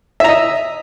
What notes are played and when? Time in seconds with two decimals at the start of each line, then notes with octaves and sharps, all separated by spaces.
0.20 E5
0.24 A#5
0.29 D#5